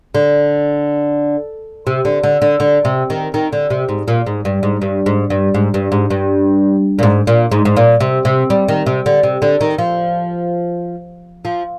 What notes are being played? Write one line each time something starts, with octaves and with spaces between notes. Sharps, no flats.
D3
C3
D3
D3
D3
D3
C3
D#3
D#3
D3
C3
G#2
A#2
G#2
G2
G#2
G2
G#2
G2
G#2
G2
G#2
G2
A#2
G#2
A#2
G#2
G#2
A#2
C3
C3
G3
D#3
C3
D3
C3
D3
D#3
F3
F3